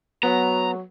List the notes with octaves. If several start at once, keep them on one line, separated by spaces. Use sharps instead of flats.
F#3 B3 A#5